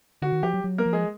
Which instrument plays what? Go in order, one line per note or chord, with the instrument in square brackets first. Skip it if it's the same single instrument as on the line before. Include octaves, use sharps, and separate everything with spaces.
[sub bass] D3 [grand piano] F#4
[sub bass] D#3
[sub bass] F3 [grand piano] G4
[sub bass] F#3
F#3
[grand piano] A#3 A#4
[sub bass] F3
[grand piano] G#3 G#4